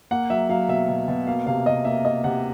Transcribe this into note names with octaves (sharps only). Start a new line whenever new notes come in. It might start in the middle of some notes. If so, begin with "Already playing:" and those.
A#3 F#5
F#3 E5
F#3 F5
B2 E5
B2
B2
A#3 F5
C3 F5
C3 D#5
A#3 E5
A#3 D#5
C3 F#5